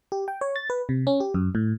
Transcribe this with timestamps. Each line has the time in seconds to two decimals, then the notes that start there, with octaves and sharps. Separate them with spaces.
0.12 G4
0.28 G5
0.41 C#5
0.56 A6
0.70 B4
0.89 C3
1.07 C#4
1.20 G4
1.34 F#2
1.55 A2